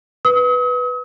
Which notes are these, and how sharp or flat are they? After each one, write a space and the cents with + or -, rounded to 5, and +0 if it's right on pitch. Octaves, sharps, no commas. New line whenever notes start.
B4 +0 D#6 +45